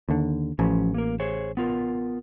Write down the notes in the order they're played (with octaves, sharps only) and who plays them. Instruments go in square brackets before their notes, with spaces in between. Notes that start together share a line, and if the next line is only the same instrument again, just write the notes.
[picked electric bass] D#2 D3
[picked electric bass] A1 [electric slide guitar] F3 C#4
[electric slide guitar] A#3 A#4
G#4 C5 C#5
B3 F4 A#4